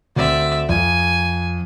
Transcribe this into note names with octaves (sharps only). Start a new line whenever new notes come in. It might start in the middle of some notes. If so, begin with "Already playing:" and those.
D2 C4 D5 E5
F2 G#5